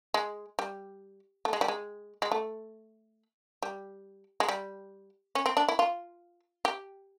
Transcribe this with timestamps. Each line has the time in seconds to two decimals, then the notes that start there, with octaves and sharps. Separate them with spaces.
0.14 G#3
0.59 G3
1.45 A3
1.53 G#3
1.61 G3
1.68 G#3
2.22 G#3
2.32 A3
3.62 G3
4.40 G#3
4.48 G3
5.35 C#4
5.46 C4
5.57 D4
5.68 E4
5.79 F4
6.65 G4